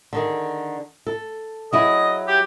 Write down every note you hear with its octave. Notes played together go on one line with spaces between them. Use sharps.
D3 D#3 G#4
A4
F#3 E4 G#4 D#5
G4